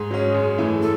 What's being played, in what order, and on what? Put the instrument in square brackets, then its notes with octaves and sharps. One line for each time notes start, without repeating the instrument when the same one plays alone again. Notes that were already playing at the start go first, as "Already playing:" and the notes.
Already playing: [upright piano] G#2 [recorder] G#4
[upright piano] F#3 C#4
F#2
E3 A3 E4
[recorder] A4